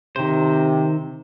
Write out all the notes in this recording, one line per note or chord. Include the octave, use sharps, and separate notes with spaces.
C3 D#3 C5